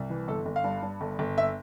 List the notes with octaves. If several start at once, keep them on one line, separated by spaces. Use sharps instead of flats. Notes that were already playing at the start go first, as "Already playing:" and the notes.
Already playing: C2
E3
G1 A4
G1
F5
G2
G2
G1
G1
E5